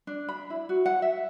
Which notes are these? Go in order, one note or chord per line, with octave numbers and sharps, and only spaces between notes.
D4
B5
E4
F#4
F#5
E5